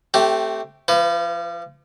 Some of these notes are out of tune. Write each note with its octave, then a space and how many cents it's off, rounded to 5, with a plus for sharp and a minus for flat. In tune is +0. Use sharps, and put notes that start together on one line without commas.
A3 +0 C4 +0 G4 -20
F3 -35 B4 +25